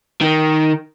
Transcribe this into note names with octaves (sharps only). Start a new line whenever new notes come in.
D#3